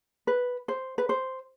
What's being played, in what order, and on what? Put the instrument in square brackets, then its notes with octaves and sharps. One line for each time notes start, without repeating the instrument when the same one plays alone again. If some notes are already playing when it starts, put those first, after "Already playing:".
[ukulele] B4
C5
B4
C5